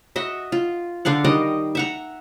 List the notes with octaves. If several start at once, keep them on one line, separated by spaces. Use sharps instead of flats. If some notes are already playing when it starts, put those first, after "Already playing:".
F#4 D#5 E5
F4
D3 D4 F5 F#5
D#3 G3 D#5
E5 F#5 A#5